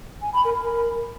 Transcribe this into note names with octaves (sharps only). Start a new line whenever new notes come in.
G#5
B5
A#4